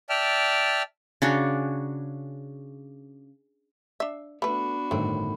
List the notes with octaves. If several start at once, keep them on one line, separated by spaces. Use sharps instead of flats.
D5 E5 G5 A5 F6
C#3 D4 F#4
D4 E5
A3 B3 D4 F#4 B4 B5
G1 A2 D#3 A3 C4